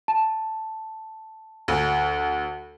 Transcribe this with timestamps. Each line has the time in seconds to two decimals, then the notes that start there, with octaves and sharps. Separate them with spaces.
0.08 A5
1.68 D2